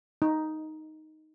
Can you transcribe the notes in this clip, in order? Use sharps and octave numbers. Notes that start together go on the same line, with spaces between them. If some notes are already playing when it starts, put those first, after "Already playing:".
D#4